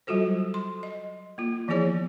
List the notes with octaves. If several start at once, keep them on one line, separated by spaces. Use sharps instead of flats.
F#3 G3 F4 F#4 A4 C5
C6
D#5
A#3 F4
E3 F3 B3 E4 G#4 C#5